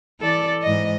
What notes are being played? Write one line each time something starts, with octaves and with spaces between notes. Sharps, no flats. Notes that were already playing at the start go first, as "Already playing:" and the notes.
E3 A4 D5
G#2 E3 D#5